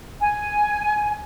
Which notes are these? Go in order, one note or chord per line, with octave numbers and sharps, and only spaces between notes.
G#5